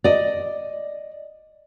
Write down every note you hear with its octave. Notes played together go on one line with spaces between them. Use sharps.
D5 D#5